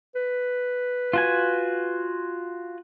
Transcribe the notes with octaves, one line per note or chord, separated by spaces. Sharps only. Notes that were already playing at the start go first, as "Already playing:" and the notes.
B4
F4 F#4 G#5